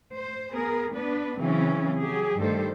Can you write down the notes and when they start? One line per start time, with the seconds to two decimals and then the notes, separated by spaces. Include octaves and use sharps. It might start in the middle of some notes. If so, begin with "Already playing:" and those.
0.13 C5
0.51 B3 G#4 A#4
0.93 B3 D4 B4
1.38 C#3 E3 F#3 C4 C#4
2.00 F#3 G4 G#4
2.38 G2 D#3 G3 A3 A4 C5